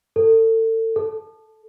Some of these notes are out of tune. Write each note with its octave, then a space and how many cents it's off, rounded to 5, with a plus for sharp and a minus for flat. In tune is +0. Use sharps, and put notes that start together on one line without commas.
A4 +35
A4 -10